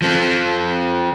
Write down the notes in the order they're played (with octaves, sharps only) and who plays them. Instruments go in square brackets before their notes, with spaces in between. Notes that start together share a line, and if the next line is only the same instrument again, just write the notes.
[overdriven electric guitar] F3 C4